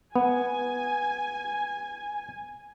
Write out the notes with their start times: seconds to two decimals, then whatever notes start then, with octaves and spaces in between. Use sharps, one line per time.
0.16 B3 G#5